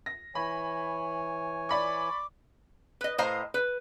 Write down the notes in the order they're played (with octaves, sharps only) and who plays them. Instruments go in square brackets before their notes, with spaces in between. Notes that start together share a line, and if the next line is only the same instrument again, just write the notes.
[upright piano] A#6
[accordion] E3 C#5 G#5 [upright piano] B5
[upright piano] D5 B5 C#6 [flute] D6
[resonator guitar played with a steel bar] B4 D#5
A2 C5 D#5 F5 A#5
B4